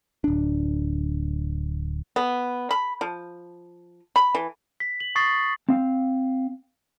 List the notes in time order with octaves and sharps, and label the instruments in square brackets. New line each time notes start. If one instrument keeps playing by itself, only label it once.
[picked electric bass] D1 D4
[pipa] B3
B5
F3
B5
E3
[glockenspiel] B6
F#7
C#6 D#6 A6 C7
[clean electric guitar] C4 F5